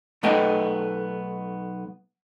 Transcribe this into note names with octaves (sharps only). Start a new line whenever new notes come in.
B1 A3 B3 A4 D#5 G5